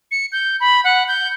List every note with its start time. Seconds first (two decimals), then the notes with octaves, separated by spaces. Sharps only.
0.11 C#7
0.32 G6
0.60 B5
0.84 F#5
1.08 G6